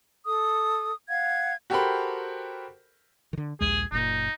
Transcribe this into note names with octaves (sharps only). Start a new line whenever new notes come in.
A4 D#6
F5 F#5 G#6
F#4 G4 A4 A#4 C5 B5
D3 D#3
A#1 D#2 G#3 G#4
F#1 A#2 D#4